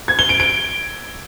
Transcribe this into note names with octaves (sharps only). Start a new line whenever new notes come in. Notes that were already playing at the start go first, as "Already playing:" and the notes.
G#6
G7
D7
D7